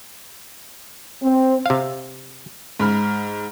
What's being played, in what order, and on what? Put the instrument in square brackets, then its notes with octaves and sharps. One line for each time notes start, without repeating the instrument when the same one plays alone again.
[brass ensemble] C4
[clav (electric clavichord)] C3 F5
[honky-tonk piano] G#2 B5 F6